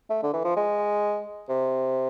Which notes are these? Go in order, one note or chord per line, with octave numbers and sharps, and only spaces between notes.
A3
D3
E3
F3
G#3
C3